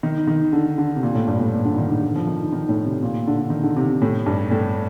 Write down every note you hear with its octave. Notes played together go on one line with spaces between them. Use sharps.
D#3
D#3
D3
D3
C3
A#2
A2
G2
A2
A#2
D3
D#3
D3
D3
F3
D#3
D#3
A2
C3
A#2
D3
D#3
D3
C3
A2
G2
A2